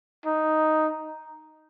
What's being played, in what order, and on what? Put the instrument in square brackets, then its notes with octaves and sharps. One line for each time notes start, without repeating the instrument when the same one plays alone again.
[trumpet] D#4